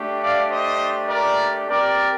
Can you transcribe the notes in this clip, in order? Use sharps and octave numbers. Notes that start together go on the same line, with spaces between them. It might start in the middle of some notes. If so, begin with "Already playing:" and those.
Already playing: A3 D4 G4
D5 F5
C5 D#5
A#4 D5
C4 G4 A#4 D5